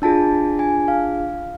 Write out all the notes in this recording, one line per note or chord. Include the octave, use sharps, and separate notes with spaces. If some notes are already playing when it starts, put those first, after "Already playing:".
D4 F4 G#4 A5
G#5
F5